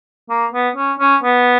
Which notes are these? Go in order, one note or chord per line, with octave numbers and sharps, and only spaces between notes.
A#3
B3
C#4
C#4
B3